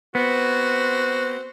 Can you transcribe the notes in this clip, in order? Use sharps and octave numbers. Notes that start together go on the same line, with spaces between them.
B3 C4 F#4